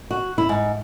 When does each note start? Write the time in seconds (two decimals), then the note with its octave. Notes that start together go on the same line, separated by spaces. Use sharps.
0.11 F#4
0.38 E4
0.49 G#2